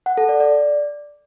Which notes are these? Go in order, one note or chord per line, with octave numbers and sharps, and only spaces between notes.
F#5
A4
D5
D5